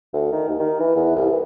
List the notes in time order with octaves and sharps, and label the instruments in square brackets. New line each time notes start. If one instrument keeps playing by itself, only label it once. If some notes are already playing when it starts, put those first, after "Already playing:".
[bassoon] D2
D#3
D#2
D#3
E3
E2
C2
E3